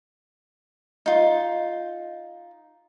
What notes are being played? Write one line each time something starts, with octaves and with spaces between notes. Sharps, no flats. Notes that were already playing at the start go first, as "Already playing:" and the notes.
D#4 F4